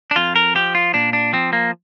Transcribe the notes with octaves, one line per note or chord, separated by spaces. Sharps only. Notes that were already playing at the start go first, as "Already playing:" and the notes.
D4
F2 F4
A#4
F3 G4
F4
A#2 D4
D4
F3 C4
A#3